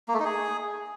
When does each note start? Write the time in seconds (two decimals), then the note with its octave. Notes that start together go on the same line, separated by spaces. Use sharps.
0.08 A#3
0.14 A3
0.19 D#4
0.25 G#4